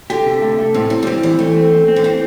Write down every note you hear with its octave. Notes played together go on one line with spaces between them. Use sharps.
D3 G4
C3
A3
A3
A2 C4
C3 C4
G3
E3 C4
E3 G3
E3 A3
C4
C4
C4
D3
E3 C4